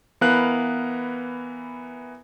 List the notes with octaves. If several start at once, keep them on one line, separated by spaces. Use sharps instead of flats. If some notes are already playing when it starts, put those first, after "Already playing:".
E3 B3 A#4 B4 F5 F#6